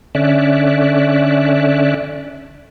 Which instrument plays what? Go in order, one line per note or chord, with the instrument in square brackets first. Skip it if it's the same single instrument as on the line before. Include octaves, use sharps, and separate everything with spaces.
[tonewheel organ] D3 C#4 D5 E5 F#6